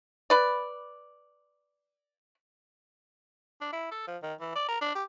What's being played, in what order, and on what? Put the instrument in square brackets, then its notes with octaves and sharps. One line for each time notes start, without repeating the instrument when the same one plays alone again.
[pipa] B4 D5
[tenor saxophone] D4
E4
A4
F3
D#3
E3
D5
A#4
D4
G4